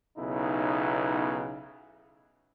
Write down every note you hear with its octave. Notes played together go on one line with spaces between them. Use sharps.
B1 C#3 B3 D#4 E4